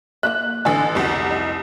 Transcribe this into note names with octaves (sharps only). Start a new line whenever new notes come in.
A#3 C#4 E5 F#6
A1 D3 A3 C#4 G#5
F1 C2 C#3 F#4
D#4